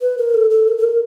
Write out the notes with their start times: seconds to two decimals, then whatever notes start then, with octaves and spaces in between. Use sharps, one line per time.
0.01 B4
0.18 A#4
0.34 A4
0.50 A4
0.68 A#4
0.78 A4
0.84 A#4